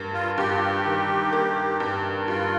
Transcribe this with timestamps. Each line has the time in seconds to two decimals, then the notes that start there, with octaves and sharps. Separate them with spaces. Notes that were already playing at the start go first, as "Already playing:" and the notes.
Already playing: G2 A#3
0.14 F4
0.38 G2 G4
0.49 F4
0.60 G4
0.85 D#3
1.33 A#3
1.80 G2
2.28 G2 F4